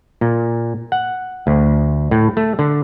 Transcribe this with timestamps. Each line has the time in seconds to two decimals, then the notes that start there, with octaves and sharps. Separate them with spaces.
0.21 A#2
0.92 F#5
1.47 D2
2.11 A2
2.37 A3
2.59 D3